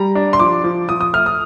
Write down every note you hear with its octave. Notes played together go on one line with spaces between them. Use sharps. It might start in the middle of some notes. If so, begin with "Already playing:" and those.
Already playing: G3 A#5
D4
C6
F3 D6
F3
F3 D#6
D#6
A3 F6
D#6